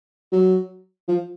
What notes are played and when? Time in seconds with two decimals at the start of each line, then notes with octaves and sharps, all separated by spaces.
0.32 F#3
1.08 F3